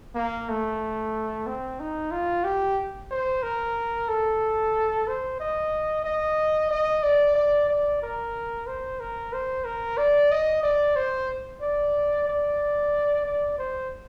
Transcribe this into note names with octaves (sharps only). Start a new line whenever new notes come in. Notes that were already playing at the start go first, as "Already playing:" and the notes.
A#3
A3
C4
D#4
F4
G4
C5
A#4
A4
C5
D#5
D#5
D#5
D5
D5
D5
A#4
C5
A#4
C5
A#4
D5
D#5
D5
C5
D5
D5
D5
C5